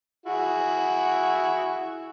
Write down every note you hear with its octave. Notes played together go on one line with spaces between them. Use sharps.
E4 F#4 G#4